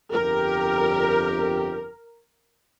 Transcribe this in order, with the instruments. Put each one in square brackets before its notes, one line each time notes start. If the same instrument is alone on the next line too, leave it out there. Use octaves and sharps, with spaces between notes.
[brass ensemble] G1 F2 G4 [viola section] A#4